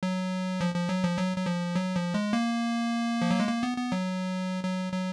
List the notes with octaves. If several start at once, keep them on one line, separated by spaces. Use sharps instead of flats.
F#3
F3
F3
F#3
F3
F#3
F#3
F3
F#3
F3
G#3
A#3
F3
F#3
G#3
A#3
B3
B3
F#3
F#3
F#3